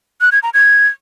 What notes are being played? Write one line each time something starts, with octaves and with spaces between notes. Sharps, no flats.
F#6
G#6
A#5
G#6